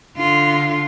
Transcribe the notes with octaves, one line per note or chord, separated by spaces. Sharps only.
D3 F4